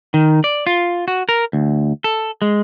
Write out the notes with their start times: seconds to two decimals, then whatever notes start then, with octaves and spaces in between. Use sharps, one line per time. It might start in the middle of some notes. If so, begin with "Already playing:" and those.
0.14 D#3
0.44 D5
0.67 F4
1.08 F#4
1.29 A#4
1.53 D2
2.04 A4
2.42 G#3